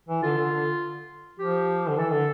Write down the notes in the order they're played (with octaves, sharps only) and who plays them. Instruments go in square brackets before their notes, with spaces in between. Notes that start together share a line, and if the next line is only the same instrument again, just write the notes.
[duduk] E3
[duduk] D3 [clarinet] F4
[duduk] D3
D3
[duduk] F3 [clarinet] G4
[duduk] D3
[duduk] E3 [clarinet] A4
[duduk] D3